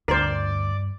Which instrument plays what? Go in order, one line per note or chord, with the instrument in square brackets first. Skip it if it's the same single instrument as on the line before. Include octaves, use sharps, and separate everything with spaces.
[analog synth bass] D2 [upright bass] G2 [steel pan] A#4 C5 [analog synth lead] D5